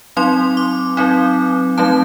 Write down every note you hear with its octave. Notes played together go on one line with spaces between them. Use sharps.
F#3 C4 D#4 C6
D6
F#3 C4 D#4
F#3 A3 C4 D#4 A5